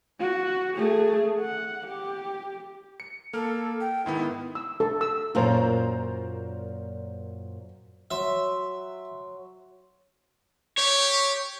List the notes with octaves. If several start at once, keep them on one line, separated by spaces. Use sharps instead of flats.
F#4
A3 G#4
F#5
G4
C#7
A#3 A4 F6
G5
G#2 D#3 B3 E4
E6
A4
E6
F#2 A#2 F4 A#4 C5 A#5
F#3 E5 C6
G4 C#5